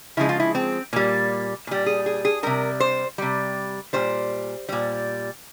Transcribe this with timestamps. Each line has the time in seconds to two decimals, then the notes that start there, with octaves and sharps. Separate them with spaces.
0.17 C#3 F3 G#3 E4
0.29 F4
0.40 E4
0.55 C4
0.93 A#2 G3 A#3
1.67 A#2 G3
1.86 G#4
2.06 G#4
2.25 G#4
2.43 C3 G3 A#4
2.80 C5
3.18 C3 G3
3.93 A#2 G3 C5
4.69 A#2 G3